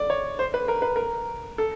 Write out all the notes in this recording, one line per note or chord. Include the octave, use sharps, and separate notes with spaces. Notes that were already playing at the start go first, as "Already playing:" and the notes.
Already playing: D5
C#5
C5
B4
A#4
B4
A#4
A4